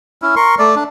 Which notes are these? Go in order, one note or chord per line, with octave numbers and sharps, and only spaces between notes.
C#4 E4
A#4 C6 C#6
A3 D5
D4